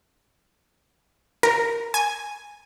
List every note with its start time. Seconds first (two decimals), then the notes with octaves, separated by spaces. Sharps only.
1.43 A#4
1.94 G#5